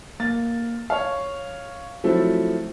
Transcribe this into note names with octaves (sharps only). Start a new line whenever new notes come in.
A#3 A6
C#5 F5
F3 F#3 A3 C4 E4